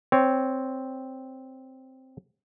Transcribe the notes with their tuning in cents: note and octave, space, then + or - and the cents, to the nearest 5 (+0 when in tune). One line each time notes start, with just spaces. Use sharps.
C4 +0 C#5 +10